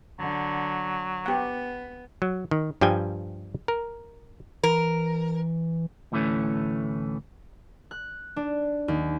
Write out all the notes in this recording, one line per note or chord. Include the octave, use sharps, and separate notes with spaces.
D3 F#3
B3 G4 F#5
F#3
D#3
G2 F3 G3 G5 G#5
A#4
E3 A#4
D2 A2 E3 A3 C#4
F#6
D4
D#2